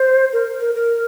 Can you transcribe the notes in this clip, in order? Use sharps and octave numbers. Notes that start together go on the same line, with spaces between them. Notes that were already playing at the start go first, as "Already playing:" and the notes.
Already playing: C5
A#4
A#4
A#4